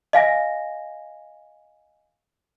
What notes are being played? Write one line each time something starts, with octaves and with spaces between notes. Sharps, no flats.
D#5 F5 G#5 A#6